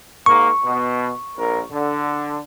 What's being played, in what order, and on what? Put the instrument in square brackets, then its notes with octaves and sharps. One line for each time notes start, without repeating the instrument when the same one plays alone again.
[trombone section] G#2 A#3 [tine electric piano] C#6
[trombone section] B2
A#1 A#4
D3